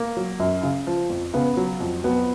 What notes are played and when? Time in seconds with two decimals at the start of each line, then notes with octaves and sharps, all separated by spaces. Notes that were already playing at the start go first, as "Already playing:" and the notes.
Already playing: A#3
0.17 F#3
0.40 F#2
0.63 C#3
0.87 F3
1.10 F2
1.34 C#3 B3
1.57 F#3
1.80 F2
2.04 F#3 B3